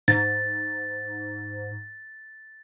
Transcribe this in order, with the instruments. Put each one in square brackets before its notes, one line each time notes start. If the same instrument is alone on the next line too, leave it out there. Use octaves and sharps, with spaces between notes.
[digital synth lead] G#2 [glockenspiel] A6